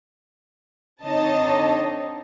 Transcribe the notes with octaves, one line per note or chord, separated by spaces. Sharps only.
D3 C4 D#4 C#5 D#5 A5